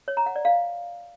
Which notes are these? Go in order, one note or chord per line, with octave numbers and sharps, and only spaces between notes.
C#5
A#5
F#5
D5
F5